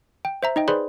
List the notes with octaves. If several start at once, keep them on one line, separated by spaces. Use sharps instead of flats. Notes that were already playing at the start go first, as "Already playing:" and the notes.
G5
C5 E5 A#5
D#4 D#5 G5
G#4 B4 C5 D5 B5 C6